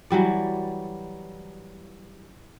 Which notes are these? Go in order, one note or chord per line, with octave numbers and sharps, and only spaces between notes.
E3 F#3 G3 D5